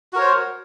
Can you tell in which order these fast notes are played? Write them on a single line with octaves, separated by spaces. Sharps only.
F#4 A#4 C#5 C5